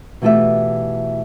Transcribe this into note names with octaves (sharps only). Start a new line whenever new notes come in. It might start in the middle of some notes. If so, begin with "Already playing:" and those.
B2 E3 A3 F4 G4 E5